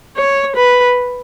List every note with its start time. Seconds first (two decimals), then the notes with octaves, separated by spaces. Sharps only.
0.17 C#5
0.56 B4